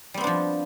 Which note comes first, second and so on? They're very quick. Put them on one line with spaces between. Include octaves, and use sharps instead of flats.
G3 C4 B3 D4 F3